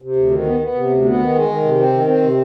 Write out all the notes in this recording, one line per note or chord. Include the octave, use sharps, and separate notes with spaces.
C3
D2
D#3
B3
B3
C3
D2
B3
D#3
G#3
D#3
C3
C4
D#3
C4
C3